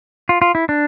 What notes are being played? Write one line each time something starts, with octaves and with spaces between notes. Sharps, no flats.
F4
F4
E4
D4